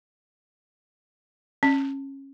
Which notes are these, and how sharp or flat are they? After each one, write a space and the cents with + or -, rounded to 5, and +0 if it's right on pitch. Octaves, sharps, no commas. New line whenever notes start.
C#4 -20